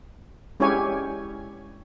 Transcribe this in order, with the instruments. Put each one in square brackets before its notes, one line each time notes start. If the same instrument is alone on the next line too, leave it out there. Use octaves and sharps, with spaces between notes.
[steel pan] G#3 C#4 E4 G4 C#5 G#5